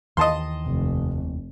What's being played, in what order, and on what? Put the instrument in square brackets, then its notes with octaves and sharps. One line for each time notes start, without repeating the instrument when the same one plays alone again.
[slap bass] D#2 D#3 E3 [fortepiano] D#5 A5 C6
[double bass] F1